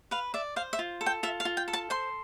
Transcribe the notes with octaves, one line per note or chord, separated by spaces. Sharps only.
B4 F5
D5 E5
C5 F5
E5
F4
A4
G5
F4 E5
F5
F4
G5
A4
A5
C5 C6